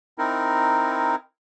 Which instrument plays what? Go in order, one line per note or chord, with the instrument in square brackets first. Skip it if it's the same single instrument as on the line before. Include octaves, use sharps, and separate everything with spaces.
[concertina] C4 D#4 E4 A#4